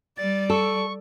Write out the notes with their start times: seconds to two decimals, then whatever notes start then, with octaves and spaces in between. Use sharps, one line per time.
0.18 G3 D5 A6
0.50 A4 C#6